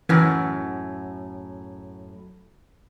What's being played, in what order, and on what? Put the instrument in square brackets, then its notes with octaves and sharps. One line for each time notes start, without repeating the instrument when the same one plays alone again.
[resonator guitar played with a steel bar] F#2 A2 [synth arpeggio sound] E3